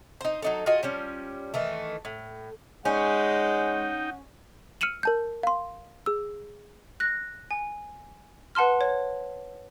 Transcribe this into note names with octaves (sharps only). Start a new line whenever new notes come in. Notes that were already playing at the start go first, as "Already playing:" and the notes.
D#4 C5
F#3 D#4 A4
F4 F#4 G#4 D#5
F3 G3 C#4
D#3 E3 A3
A2
G#3 C#4 D#4 F#5 G5
E6 F6 C#7 D#7 E7 F#7
A#4 A5 G6
F5 C6
G#4 E6
F#6 A#6
G#5
B4 F#5 A5 C6 F6
C#5